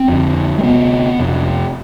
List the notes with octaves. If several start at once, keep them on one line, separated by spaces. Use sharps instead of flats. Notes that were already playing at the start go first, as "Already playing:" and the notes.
Already playing: C4
F2 D3
G#3
D2 C3 B3
F2 C3